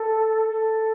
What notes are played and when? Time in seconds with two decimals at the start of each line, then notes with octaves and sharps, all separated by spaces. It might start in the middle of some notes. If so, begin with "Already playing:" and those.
Already playing: A4
0.51 A4